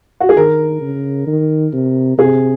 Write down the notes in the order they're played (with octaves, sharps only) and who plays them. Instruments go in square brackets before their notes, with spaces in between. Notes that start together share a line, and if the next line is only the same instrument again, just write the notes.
[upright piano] F#4
G#4
[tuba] D#3 [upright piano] A#4
[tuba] C#3
D#3
C3
[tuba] C3 [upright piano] G#4